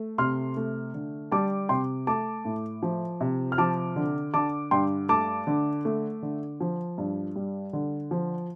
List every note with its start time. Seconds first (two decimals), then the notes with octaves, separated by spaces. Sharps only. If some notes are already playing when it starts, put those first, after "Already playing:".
Already playing: A3
0.18 C3 C6 F6
0.57 A3
0.94 D3
1.32 G3 A5 D6
1.69 C3 G5 C6
2.07 A3 A5 D6
2.45 A2
2.83 F3
3.21 C3
3.52 F6
3.58 F3 A5 D6
3.96 D3
4.34 D3 A5 D6
4.71 G2 G5 C6
5.09 A3 A5 D6
5.47 D3
5.85 A3
6.22 D3
6.61 F3
6.98 G2
7.36 G3
7.73 D3
8.11 F3